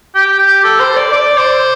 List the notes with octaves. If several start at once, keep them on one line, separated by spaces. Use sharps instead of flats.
G4
A4
C5
D5
D5
C5